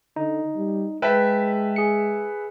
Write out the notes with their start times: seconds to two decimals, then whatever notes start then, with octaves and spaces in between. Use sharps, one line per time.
0.16 D3 D#4
0.56 G3
1.02 G#3 B4 E5 G5 A5 B6
1.76 G#4 C#7